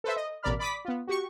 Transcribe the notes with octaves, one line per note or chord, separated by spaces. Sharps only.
A4 B4 C5 E5
D#5
A1 B2 A#4 D5 B5 F6
D5 B5 D6 D#6 B6
B3 F4
F#4 G4 C#6